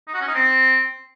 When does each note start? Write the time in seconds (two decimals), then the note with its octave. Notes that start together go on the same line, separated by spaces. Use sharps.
0.08 D#4
0.14 F#4
0.21 C#4
0.28 D#4
0.34 C4